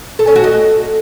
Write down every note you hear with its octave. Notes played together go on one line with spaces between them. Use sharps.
A4
C#4
F#4
D#5